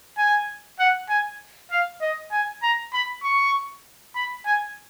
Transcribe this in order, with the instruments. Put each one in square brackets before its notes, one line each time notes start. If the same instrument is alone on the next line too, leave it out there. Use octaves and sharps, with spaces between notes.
[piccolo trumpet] G#5
F#5
G#5
F5
D#5
G#5
A#5
B5
C#6
B5
G#5